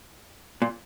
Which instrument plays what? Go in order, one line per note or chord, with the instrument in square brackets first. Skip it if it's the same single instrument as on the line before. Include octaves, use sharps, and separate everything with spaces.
[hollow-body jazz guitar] A#2